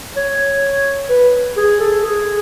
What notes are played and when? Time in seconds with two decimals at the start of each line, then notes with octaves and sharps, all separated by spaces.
0.17 C#5
1.09 B4
1.57 G#4
1.80 A4
2.04 G#4